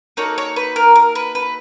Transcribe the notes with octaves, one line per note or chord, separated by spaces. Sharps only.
A#3 D#4 F#4 A4 C#5
C#5
B4
A#4
A#4
B4
B4